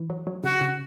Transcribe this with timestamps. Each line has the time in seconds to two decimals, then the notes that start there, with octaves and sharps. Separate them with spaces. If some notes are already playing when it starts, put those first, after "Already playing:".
Already playing: E3
0.10 F#3
0.27 F#3
0.44 C#3 F#4
0.61 C#3